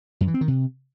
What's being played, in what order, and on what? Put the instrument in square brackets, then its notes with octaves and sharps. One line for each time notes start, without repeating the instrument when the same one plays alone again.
[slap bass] F#2
E3
C4
D#3
C3